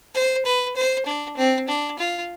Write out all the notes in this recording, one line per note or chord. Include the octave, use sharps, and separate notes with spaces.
C5
B4
C5
D4
C4
D4
F4